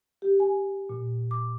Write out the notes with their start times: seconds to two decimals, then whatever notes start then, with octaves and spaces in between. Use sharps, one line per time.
0.22 G4
0.40 G#5
0.89 A#2
1.31 D6